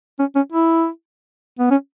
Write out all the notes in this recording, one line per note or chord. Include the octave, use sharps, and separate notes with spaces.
C#4
C#4
E4
B3
C#4